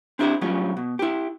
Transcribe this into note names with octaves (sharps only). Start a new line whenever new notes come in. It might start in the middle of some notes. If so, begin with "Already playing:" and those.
C4 D4 E4 G4 A4 C5
A2 F#3 G3 C#4 F4
B2
E4 G4